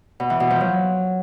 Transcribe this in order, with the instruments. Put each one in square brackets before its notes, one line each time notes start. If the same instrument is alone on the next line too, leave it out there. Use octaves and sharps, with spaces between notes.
[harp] B2
E3
B2
F3
F#3